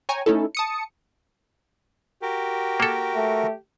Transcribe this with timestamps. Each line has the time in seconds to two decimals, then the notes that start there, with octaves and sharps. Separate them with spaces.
0.09 C#5 G5 G#5 A#5 C#6
0.26 A3 C#4 D#4 E4 A4
0.55 A5 D#6 C#7
2.22 F#4 G4 A#4
2.80 A#3 A4
3.15 A3